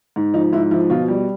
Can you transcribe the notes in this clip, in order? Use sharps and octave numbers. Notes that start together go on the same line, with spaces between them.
G#2
F3 D#4
G#2 E4
F3 E4
B2 F4
G3